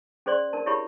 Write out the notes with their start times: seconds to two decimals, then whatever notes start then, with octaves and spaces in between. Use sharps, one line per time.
0.26 C#4 G#4 C5 D5 C6
0.53 D4 A#4 A5
0.66 E4 G4 G#4 C#5 E5 B5